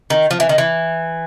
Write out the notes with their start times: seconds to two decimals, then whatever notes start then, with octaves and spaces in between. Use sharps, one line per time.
0.10 D#3
0.31 F3
0.40 E3
0.49 D#3
0.58 E3